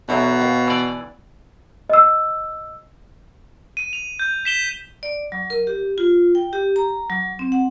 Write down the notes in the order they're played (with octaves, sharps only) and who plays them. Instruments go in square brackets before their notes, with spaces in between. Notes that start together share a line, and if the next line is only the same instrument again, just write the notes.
[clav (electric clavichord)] B1 E2 F#3 [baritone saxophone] B2
[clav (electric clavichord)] D#2
E3 D5
[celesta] D#5 E6
[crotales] D#7
F7
G6
B6 E7 G7
[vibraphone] D5
F#3
A#4
G4
F4
G5
G4
A#5
F#3
C4
F#5